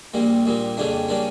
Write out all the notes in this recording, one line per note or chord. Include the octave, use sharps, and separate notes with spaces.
A#1 A#2 G3 A#3
A#1 A#2 G3 A#3
F2 C#3 G3 A#3 D4
C#3 G3 A#3 D4